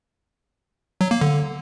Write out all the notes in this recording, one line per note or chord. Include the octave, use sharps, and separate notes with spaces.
F#3
A#3
D3